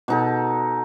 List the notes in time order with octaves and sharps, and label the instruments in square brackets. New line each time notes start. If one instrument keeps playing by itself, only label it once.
[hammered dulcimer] B2 D#4 A4